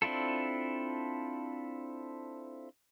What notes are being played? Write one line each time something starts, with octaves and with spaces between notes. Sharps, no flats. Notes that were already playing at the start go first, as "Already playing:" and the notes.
C4 D4 E4 F4 A4